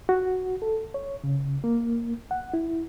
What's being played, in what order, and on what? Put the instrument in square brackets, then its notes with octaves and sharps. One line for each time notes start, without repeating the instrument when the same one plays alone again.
[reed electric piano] F#4
A4
C#5
C#3
A#3
F#5
E4